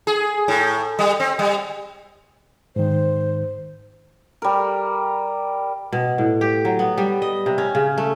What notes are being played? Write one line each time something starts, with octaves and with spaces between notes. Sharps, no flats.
G#4
A2
G3
C4
G3
G#2 D#3 C5
G3 A#4
B2
A2
G4
F#3
B3
G3
D#5
C3
C#4
C#3
A3